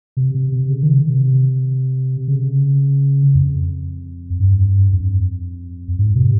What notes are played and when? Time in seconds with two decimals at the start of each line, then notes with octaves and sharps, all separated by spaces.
0.17 C3
0.35 C3
0.52 C3
0.69 C#3
0.83 D#3
1.10 C3
2.28 C#3
3.35 F2
4.40 G2
4.93 F2
5.99 G#2
6.16 C3